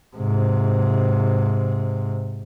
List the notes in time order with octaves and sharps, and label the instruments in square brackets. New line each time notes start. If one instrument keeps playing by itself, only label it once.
[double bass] G#2 C3